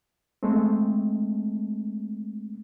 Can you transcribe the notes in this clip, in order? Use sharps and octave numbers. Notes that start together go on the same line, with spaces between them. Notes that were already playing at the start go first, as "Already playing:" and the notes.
G#3 A3 C4